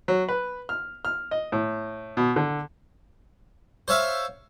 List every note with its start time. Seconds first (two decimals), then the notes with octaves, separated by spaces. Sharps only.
0.08 F#3
0.29 B4
0.69 F6
1.05 F6
1.31 D#5
1.52 A2
2.17 B2
2.36 D3
3.88 C5 C#5 E5 F5